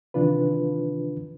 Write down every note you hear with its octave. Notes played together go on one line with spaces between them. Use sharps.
C3 D#3 E3 D4 F4 B4